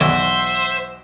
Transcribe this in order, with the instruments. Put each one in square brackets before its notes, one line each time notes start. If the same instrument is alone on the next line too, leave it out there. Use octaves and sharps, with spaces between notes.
[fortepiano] B1 E2 [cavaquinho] F#4 [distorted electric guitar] C5 [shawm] E5